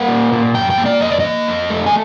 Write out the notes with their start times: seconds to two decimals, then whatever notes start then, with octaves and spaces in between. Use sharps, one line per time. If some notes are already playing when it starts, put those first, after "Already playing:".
Already playing: A#3 F#5
0.08 A#2
0.32 A#2
0.54 F#2 G5
0.70 G5
0.78 A#3
0.86 D5
1.00 F2 D#5
1.10 D5
1.20 A#3 D#5
1.47 F2
1.70 A3
1.86 G#5